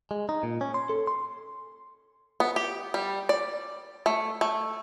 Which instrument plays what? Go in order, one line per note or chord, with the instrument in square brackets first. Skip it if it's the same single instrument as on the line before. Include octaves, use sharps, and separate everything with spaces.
[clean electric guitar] G#3
D#4
A#2
C#4
C6
A4
C6
[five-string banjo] B3
G4
G3
D5
A3
A3